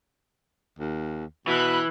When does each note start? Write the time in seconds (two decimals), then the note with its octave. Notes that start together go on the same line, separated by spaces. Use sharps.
0.79 D#2
1.47 B2 E3 B5 F#6